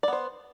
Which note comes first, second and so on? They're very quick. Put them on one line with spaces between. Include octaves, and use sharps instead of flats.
D5 B3 C5